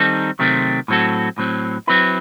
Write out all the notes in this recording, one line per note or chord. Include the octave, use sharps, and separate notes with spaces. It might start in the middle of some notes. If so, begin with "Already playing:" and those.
Already playing: D#3 G3 C4 D#4 A4
C3 D#3 F#3 A3 C4
A2 F#3 C4 F#4 A4
A2 F#3 C4
F#3 C4 E4 B4